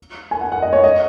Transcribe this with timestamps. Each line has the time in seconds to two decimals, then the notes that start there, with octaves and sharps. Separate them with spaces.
0.31 G#5
0.41 F#5
0.52 F#5
0.62 D#5
0.73 C#5
0.84 D#5